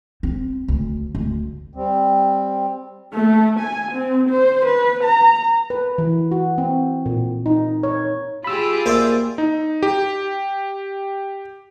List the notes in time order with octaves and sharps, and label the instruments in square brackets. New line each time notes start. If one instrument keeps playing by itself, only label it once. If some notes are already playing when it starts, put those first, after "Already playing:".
[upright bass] C4
D2
D2
[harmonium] G3 C4
[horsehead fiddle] A3
G#5
C4
C5
B4
A#5
[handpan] B4
E3
F#4
C4
A#2
D#4
C#5
[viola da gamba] F4 G4 G#4 [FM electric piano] B5 E6
[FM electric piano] A#3 [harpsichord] C5 D5 E5
[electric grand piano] D#4
G4